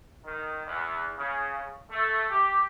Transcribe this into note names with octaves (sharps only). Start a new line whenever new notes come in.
D#3
E2
C#3
A3
G4